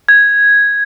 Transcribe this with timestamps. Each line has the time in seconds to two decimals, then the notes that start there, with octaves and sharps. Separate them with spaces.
0.09 G#6